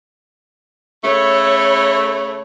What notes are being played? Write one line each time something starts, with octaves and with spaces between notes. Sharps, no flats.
C#3 A3 C#5 B5